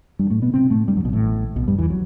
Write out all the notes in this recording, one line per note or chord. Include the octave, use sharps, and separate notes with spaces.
G2 G3
A2 A3
B2 B3
C3 C4
A2 A3
G2 G3
F#2 F#3
B1 B2
A1 A2
B1 B2
G2 G3
E2 E3
F#3